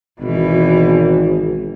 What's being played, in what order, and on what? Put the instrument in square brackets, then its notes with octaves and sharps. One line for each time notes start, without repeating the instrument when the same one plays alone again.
[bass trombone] G#1 [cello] B2 E3